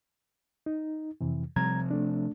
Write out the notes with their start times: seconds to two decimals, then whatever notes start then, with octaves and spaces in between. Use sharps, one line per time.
0.66 D#4
1.21 F2 C3 E3
1.56 C3 F3 G3 C4 A#5 G#6
1.91 A3 D4